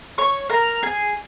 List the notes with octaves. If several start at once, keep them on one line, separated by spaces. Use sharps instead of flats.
C#5 C#6
A#4 A#5
G#4 G#5